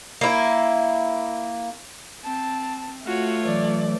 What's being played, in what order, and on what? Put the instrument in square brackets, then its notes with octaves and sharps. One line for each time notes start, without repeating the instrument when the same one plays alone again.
[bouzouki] A#3 E4
[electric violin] C4 [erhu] A5
[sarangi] A3 [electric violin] F4 C#5 [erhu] F#4
[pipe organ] E3 F#3 [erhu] D5